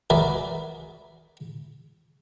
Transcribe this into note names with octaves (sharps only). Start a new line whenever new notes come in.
F#4 G#4 A#4 B4 D5 E5